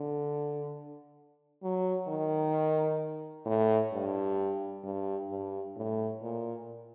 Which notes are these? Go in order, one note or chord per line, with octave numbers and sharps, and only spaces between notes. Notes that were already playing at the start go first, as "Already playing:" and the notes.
Already playing: D3
F#3
D#3
A2
G2
G2
G2
A2
A#2